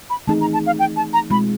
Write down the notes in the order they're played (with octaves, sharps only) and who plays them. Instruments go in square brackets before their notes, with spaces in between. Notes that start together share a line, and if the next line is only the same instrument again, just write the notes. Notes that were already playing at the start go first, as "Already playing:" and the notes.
[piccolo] B5
[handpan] E3 A3 C4 D#4 G#4 [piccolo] A5
[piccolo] A#5
A5
F5
G5
A5
A#5
[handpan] B2 G#3 C4 F4 [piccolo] B5